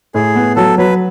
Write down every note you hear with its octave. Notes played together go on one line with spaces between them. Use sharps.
A2 G#4
B3
F#3 A4
F#3 B4